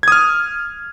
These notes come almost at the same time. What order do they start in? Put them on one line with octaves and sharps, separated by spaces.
G#6 D#6 F6